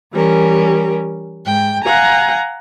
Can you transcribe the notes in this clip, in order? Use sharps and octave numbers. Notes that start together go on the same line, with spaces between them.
E3 G3 C#4 A#4
G#2 G5
F5 F#5 G#5 A#5